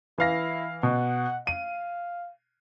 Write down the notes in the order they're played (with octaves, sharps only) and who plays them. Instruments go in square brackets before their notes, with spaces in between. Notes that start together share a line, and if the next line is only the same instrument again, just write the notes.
[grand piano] E3 F5 A#6 [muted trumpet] E4
[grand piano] B2 [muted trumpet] F#5
[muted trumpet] F5 [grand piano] D#7